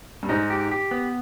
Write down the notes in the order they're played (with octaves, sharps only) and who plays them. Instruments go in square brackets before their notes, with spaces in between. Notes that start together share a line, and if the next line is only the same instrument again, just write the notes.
[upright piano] G2
[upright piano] G#2 [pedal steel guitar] D#4
[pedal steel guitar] G4
G4
B3